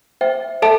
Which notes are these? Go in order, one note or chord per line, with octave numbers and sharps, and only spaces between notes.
C5 E5 G5
A4 E5 A5